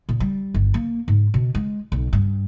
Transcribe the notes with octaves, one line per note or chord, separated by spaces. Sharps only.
A#2
G3
G1
A#3
G#2
B2
G#3
B1
G2